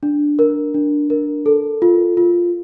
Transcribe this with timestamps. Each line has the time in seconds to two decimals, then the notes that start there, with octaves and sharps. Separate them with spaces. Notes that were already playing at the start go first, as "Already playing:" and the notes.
0.03 D4
0.39 A#4
0.74 D4
1.10 A#4
1.46 A4
1.82 F4
2.17 F4